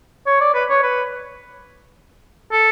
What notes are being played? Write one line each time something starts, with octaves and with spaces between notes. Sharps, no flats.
C#5
D5
B4
C#5
B4
A4